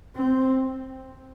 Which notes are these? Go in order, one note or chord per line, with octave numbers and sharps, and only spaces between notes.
C4